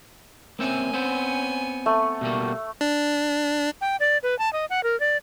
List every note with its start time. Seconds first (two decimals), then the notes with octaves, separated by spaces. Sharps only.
0.59 A#3 C4 C#4 E5 G#5
0.93 B3 C4 C5
1.86 A3
2.21 B2 G3 A#3
2.81 D4
3.81 G5
4.00 D5
4.23 B4
4.39 A5
4.53 D#5
4.70 F#5
4.83 A#4
5.00 D5